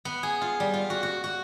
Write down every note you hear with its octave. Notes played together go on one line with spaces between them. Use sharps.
B3
G#4
F4
G3
F4
F#4
F#4
F#4